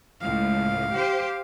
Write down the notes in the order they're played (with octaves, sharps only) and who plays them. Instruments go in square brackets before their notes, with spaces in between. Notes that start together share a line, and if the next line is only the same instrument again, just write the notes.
[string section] C#2 A2 [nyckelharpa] F5
[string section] G4 C5